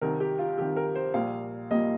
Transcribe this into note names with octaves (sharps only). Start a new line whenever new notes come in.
C2 C3 D#3 A#4
G4
F4
C2 C3 D#3 G4
A#4
C5
A#1 A#2 G3 A#3 F5
A#1 A#2 G3 A#3 D#5